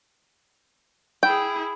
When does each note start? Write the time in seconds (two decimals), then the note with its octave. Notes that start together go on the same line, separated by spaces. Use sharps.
1.23 E4 G#4 G5